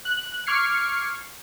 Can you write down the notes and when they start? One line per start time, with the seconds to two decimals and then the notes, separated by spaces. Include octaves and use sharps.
0.05 F#6
0.47 C#6 D6 F6 G#6 C7 C#7